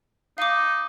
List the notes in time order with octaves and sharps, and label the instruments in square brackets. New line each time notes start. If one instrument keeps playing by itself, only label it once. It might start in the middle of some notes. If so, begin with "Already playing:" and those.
[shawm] D#4 [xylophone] F5 D6